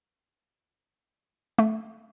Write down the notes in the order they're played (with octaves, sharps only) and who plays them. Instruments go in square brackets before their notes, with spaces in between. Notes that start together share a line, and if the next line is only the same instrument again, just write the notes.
[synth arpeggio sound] A3